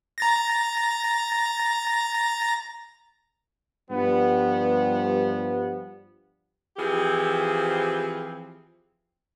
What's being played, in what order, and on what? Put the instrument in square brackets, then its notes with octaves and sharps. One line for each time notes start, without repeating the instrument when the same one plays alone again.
[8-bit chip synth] A#5 A6 A#6
[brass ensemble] G2 F3 G3 B3
[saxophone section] E3 F3 C4 G4 G#4